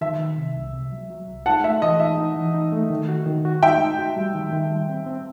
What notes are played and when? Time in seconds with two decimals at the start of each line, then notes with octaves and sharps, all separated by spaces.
0.01 D#3 E5
0.19 D#3
0.38 C3
0.56 C2
0.73 C3
0.92 F#3
1.10 F#3
1.28 C2
1.46 D#4 F#5 A5
1.64 A3 E5
1.82 E3 D#5
2.00 D#4 E5
2.18 D#4
2.36 E3
2.54 D#4
2.72 A3
2.90 D#3
3.09 F#4
3.26 D#3
3.45 F#4
3.63 D#4 E5 G5
3.80 D#4
3.98 F#4
4.16 G3
4.35 D#3
4.53 D#3
4.71 G3
4.89 C4
5.06 C4